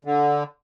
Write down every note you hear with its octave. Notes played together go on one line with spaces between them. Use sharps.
D3